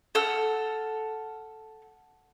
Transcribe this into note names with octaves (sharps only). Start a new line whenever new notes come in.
A4 F#5 E6 F6